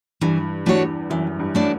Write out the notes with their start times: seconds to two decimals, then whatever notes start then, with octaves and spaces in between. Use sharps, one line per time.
0.21 G2 E3
0.66 E2 A3 D4 F#4 C#5
1.10 F#2 E3
1.40 G2
1.55 A3 D4 F#4 C#5